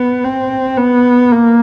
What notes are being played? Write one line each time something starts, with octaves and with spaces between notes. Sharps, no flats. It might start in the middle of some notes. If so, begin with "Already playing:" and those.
Already playing: B3
C4
B3
A#3